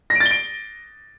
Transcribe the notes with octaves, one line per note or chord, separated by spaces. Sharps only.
A#6
D7
A6
G7
D7